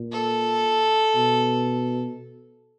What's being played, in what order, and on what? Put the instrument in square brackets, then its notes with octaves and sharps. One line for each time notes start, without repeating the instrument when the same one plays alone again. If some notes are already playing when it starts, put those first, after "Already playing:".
Already playing: [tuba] A#2
[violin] A4
[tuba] B2